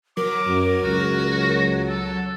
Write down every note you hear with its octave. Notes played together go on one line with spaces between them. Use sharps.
F#3 A#4 D6
F#2
C#2 F#4
A4